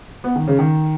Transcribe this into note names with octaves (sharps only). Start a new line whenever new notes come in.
B3
D#3
C#3
D#3